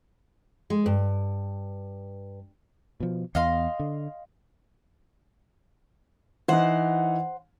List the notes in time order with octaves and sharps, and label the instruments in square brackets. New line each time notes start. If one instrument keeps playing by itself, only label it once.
[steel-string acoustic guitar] G#3
G2
[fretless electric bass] B2 F3
[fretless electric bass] E2 E3 B3 [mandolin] D#5 F5 C6
[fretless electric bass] D3
[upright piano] E3 D#4 [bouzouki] C5 F#5